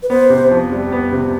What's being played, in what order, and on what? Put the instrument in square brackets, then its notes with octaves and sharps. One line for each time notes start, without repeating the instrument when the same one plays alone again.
[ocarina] B4
[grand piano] B3 [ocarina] C5
[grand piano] C3
F2
G3
B3
C3